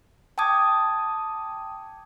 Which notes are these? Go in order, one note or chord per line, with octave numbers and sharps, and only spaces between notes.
G5 A5 D6 D#6 G#6